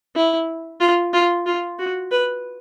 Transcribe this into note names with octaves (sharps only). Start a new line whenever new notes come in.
E4
F4
F4
F4
F#4
B4